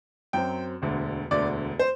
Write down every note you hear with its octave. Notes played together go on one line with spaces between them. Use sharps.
F#2 F#3 C4 G5
E1 D2 D3
E1 D2 D3 D5
C5